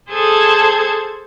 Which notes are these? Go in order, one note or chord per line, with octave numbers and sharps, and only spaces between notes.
G#4 A4 C5 A5 G#6